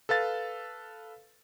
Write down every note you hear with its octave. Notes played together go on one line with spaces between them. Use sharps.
A4 B4 F5 A6